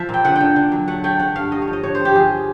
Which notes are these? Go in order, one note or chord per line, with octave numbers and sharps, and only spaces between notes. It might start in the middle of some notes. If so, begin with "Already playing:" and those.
Already playing: F3 E5
A#2 G5
D3 F#5
D3 G5
D3
F#3
A3 F#5
A3 G5
A3 F#5
G2 F5
G2 D#5
C#5
F3
D#5
D3 C#5
C5
G2
G4
F3 G#4